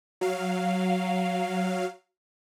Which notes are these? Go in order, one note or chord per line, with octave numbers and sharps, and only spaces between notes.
F#3 F5